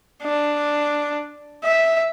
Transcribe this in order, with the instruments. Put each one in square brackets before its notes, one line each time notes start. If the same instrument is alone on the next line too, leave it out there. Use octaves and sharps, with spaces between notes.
[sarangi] D4
E5